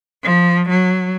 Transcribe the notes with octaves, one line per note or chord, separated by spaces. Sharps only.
F3
F#3